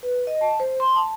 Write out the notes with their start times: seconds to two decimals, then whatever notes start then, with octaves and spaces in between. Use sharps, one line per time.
0.03 B4
0.27 D#5
0.41 A5
0.60 C5
0.80 C6
0.96 A5